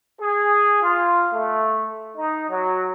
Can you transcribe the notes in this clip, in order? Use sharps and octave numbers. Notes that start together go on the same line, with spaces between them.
G#4
F4
A3
D#4
F#3